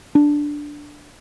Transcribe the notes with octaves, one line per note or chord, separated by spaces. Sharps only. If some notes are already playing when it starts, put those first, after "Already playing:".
D4